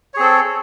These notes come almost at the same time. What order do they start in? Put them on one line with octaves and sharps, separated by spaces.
C#5 G#4 C4 A4